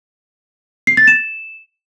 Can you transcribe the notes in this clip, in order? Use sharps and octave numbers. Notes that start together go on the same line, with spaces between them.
C7
A6
E7